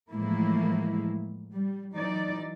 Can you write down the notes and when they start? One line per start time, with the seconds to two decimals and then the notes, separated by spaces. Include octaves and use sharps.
0.11 A2 E3 F3 G#3 A#3 E4
1.52 G3
1.95 E3 F#3 D#4 D5